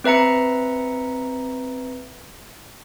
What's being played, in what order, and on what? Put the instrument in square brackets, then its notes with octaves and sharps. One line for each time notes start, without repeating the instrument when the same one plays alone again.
[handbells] C4 B4 E5 A#5 C#7